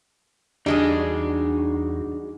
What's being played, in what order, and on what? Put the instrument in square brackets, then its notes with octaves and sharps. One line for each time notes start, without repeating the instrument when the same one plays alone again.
[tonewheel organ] E2 F#4 [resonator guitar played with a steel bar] G3 G#3 G#4 [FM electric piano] D4 [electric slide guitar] D#4 A5